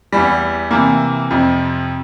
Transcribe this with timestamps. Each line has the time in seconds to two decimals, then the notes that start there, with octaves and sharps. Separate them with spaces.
0.13 E2 E3 G3
0.71 C3 E3 A#3
1.31 F2 C3 F3